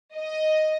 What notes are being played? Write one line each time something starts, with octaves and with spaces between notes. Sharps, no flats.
D#5